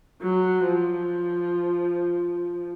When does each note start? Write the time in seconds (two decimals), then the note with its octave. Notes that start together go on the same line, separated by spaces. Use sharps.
0.22 F#3
0.68 F3